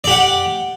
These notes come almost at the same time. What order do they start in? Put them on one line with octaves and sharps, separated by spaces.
D5 G4 F#5